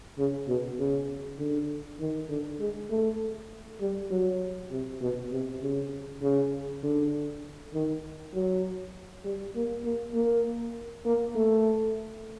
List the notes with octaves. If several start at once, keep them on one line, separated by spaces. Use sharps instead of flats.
C#3
B2
C#3
D3
D#3
D3
G#3
A3
G3
F#3
C3
B2
C3
C#3
C#3
D3
D#3
F#3
G3
A#3
A#3
A#3
A#3
A3